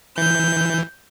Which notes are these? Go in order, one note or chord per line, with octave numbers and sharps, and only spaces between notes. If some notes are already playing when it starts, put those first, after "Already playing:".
E3 G6